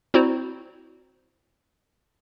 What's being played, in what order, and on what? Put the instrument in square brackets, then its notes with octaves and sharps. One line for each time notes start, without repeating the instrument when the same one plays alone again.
[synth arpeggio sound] C4 E4 F#4 C5 D5 A#5